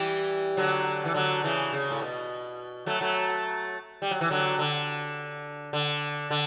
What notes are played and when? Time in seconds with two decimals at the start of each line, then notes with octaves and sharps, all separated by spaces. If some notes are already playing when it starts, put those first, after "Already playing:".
Already playing: E3 G3
0.57 D3 F#3
1.05 E3
1.14 D3 F#3
1.44 C#3 E3
1.73 C#3
1.91 A2
2.01 B2
2.86 F#3 A3
3.01 F#3 A3
4.02 G3
4.11 F#3
4.21 E3
4.31 D3 F#3
4.59 D3
5.73 D3
6.31 D3